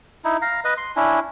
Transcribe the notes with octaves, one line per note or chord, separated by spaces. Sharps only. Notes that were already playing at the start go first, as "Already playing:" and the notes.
D#4 E4
F5 A#5
B4 D#5
C6
C#4 D4 E4